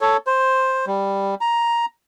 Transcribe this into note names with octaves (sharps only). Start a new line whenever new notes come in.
A4 C#5
C5
G3
A#5